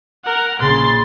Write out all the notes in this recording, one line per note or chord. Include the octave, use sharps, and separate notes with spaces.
A#4 F#5
A#1 C#3 C6 A6